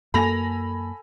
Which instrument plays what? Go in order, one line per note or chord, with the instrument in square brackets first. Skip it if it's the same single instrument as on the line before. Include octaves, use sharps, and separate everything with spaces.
[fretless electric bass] F#2 A#3 [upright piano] A4 G#5 [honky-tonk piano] B5 A#6 F7